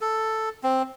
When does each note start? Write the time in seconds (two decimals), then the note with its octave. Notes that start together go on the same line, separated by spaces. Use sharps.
0.01 A4
0.63 C4